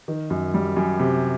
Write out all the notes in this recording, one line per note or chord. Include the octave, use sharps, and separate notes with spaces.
D#3
F#2
G3
F#2
C3